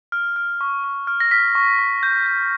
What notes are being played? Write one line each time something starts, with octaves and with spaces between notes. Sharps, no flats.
F6
F6
C#6
C#6
F6
A#6
F6 B6
C#6
C#6
G6
G6